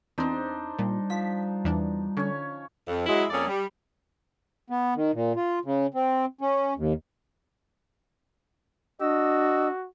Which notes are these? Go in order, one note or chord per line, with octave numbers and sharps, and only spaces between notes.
E2 C4 D4 D#4 C5
A#2 G3
F3 B6
E2 E3 D4
D3 C#4 C#5
F2
F#3 G#3 E4
F2 A#3 C#4 G#4 A4 D5
G3
B3
D#3
A#2
F4
C#3
C4
C#4
D#2
D4 F#4 D#5 E6